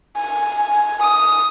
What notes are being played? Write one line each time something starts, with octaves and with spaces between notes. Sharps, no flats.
G#5
D#6